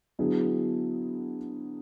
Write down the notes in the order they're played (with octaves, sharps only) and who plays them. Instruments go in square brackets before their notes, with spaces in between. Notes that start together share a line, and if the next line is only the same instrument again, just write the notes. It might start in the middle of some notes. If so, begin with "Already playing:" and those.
[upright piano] D3 F#3 B3 E4 G#4